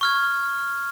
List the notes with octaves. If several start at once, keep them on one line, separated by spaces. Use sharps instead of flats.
C#6 F6 G#6